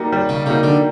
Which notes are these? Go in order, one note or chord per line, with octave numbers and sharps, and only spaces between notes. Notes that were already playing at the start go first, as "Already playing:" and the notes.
Already playing: G3 A#3 D#4 F#4
G3
C#3
C#3 A#3 D#4 F#4
D3